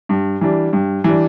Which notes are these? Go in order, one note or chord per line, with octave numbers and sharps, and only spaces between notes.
G2
E3 G3 D4
G2
E3 G3 D4